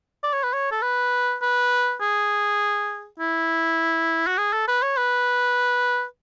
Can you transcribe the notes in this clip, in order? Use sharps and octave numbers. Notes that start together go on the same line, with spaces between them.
D5
C#5
B4
C#5
A4
B4
B4
G#4
E4
F#4
G#4
A4
B4
C#5
B4